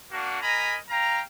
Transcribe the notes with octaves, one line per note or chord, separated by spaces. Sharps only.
A#3 D4 F#4
A#4 D#5 G#5 A#5 B5
F5 G5 A#5